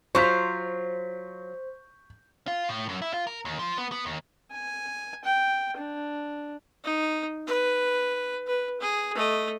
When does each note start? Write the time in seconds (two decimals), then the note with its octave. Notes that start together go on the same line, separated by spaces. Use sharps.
0.15 F#3 F4 C5 C#6 G6 B6
2.48 F4
2.69 A2
2.89 F#2
3.02 E4
3.14 F4
3.27 A#4
3.45 D#2
3.59 F3
3.78 B3
3.92 B3
4.06 D#2
4.51 G#5
5.25 G5
5.77 D4
6.84 D#4
7.47 B4
8.47 B4
8.80 G#4
9.15 A3 D#5